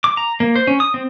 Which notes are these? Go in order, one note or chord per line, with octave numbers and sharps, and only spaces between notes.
D6
A#5
A#3
C5
C#4
D#6
C4